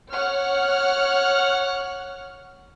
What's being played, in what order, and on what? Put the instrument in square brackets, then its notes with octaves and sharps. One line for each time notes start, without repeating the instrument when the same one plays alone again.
[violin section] C#5 F#5 F6